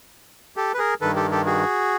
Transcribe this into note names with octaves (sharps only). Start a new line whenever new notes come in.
G4 A4
B4
G#4 A#4
G2 D#3 A4 B4
G4 A4
G4 A4
F#4 G#4